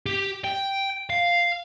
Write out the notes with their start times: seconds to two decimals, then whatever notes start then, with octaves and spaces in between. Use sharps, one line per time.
0.06 G4
0.44 G5
1.10 F5